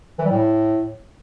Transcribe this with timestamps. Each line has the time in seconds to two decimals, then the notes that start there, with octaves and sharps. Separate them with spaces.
0.19 E3
0.25 G3
0.31 A2